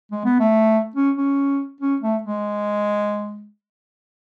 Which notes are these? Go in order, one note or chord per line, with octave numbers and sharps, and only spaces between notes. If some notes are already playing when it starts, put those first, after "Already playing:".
G#3
B3
A3
C#4
C#4
C#4
A3
G#3